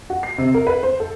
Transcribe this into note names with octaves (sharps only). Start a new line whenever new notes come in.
F#4
C7
C3
A#4
B4
C5
A4